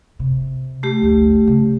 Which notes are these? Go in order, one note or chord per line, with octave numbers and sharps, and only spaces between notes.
C3
A3 G4
G1 D2
C#3